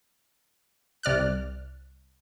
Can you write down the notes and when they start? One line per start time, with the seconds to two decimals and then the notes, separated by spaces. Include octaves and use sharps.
1.03 C2 D5 F6 F#6